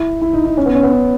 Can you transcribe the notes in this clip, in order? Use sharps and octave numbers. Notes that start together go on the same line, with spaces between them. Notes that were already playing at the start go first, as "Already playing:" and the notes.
Already playing: E4
E4
D#4
D#4
C#4
B3
C#4
B3
C#4